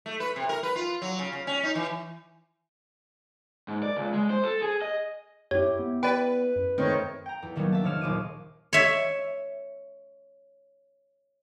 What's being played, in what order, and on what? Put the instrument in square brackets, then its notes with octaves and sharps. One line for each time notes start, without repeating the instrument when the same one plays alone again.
[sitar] A3
B4
C3
A#4
B4
F4
F#3
C#3
C#3
C#4
D#4
E3
[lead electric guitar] G#2
D5
C#2
G#3
C5
A4
G#4
D#5
[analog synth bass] F#2 [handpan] E4 G4 [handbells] C#5
[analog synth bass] B3
[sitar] B4 [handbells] D5 G5
[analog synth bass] F#2
[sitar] D#3 [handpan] A3 C4 C#5
[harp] G5 A#5
E2
D#3 F#3 G3 A#3 B3 C#4
D4 E5 A5
F1 D#3 C#5 F6 E7
A#1 D#2 D6 D#7
[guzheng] C#5 E5